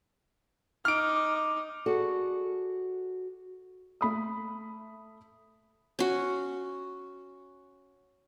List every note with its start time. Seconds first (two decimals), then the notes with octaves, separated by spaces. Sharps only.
0.85 D#4 D6 F6 D7
1.86 F#4 G#4 A4 D5 F#5
4.01 A3 B5 D#6
5.99 C#4 F#4